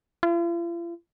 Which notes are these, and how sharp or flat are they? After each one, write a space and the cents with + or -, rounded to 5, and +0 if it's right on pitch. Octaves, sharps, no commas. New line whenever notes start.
F4 -45